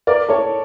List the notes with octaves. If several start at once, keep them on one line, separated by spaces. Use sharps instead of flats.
A#4 D5
A4 C#5